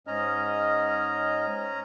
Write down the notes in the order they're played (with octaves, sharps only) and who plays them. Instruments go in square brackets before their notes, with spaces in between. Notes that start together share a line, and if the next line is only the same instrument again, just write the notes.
[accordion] G#2 D#5 F6 [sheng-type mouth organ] C#4 A#5